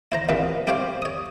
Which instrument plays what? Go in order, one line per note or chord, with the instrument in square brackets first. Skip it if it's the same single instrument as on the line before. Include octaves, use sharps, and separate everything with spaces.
[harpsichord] E4 C5 A#5
A#1 D#2 E3 C4 B4
C4 E4 G4 C5 C#5 F5
C#5 D#6